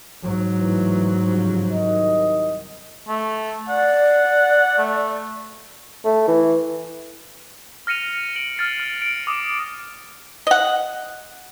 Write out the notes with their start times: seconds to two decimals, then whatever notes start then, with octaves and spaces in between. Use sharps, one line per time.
0.22 G#2 F#3
0.58 A2 E3
1.27 G2 C#3 F3
1.70 C2 D#3 D#5
3.08 A3
3.69 D5 F#5
4.78 A3
6.05 A3
6.28 E3
7.87 F6 A#6 C#7 D#7 F7
8.36 D7 F#7
8.58 F6 A6 C7
8.80 F6 F#7
9.02 D7
9.27 D6 D#6
10.47 D#5 F#5